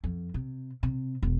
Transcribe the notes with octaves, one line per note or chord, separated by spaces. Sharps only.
F2
C3
C3
E1